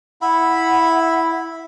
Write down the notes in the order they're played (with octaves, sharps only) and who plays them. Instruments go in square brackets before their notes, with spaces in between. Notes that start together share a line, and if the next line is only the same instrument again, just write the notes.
[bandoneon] E4 [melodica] E5 B5 [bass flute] F#5